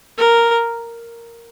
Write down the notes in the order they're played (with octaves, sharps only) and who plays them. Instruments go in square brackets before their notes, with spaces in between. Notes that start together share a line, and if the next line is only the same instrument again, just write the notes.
[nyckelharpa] A#4